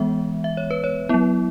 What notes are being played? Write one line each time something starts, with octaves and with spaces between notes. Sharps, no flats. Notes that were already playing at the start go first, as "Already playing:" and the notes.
Already playing: E3 G#3 B3 E5
E5
C#5
B4
C#5
F#3 B3 E4